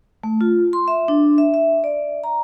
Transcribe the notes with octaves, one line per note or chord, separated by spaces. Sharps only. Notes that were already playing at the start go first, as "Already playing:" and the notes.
A3
F4
C6
E5
D4
E5
E5
D5
A#5